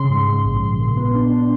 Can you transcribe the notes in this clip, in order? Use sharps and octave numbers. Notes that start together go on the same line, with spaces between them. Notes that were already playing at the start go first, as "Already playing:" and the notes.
Already playing: C#3 C6
G#2
G#2
A#1
G#2
A#2
B3
D4
D4